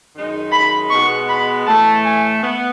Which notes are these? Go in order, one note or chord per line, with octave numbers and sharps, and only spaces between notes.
F#2 D#3 G#3 D#4
B5
B2 G#3 B3 C#6
B5
A2 E3 A3 A5
G#5
B3